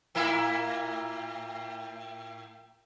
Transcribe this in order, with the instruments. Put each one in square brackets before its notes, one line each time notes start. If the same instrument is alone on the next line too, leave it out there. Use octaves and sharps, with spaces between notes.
[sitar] A2 A#3 E4